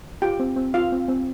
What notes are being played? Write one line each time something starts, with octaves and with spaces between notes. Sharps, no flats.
F4 G4 G5
C4
C4
F4 F5
C4
C4